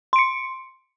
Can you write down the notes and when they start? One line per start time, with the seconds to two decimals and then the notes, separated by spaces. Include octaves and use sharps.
0.13 C6
0.16 D7
0.19 C#7